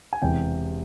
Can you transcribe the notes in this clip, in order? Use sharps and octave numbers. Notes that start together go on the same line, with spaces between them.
G#5
E1 E2 C3 G5